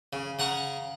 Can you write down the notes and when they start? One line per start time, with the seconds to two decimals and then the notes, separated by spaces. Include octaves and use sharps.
0.13 C#3
0.39 C#3 F#5 A#5 C#6